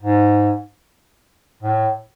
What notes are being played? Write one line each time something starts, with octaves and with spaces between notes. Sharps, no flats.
G#2
A2